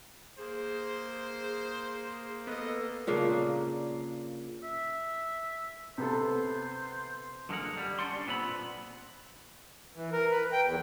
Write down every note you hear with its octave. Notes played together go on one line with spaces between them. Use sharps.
A#3 G#4 C5
B3 A4 D#5
A#2 C#3 A#3 D4
E5
C3 B3 A4 C5
F#2 D3 G#3 A#3 A#4 F#5
G3
C#4 D4 D5 F#5 C6
B1 A#2 B3 C4 B5
E3
A#4
B4
G5
E2